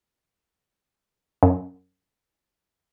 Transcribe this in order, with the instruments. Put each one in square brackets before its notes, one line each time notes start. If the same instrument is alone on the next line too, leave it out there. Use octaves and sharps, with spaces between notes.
[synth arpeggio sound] F#2